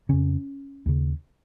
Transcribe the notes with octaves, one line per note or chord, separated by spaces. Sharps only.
F2 C#3 C#4
D#2 C#3